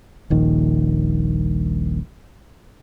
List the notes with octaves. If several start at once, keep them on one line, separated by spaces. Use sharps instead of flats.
D#1 A#1 D#3